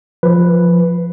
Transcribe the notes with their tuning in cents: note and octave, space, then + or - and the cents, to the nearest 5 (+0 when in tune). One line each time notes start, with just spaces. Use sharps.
F3 +0 B4 +0